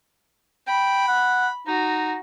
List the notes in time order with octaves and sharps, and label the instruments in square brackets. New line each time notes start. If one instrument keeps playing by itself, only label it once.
[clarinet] G5 [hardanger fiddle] B5
[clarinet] F#5
[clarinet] D#4 [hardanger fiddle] F#4